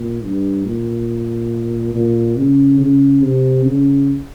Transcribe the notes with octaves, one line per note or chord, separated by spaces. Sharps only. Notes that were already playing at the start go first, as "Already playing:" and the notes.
Already playing: A#2
G2
A#2
A#2
C#3
C#3
C3
C#3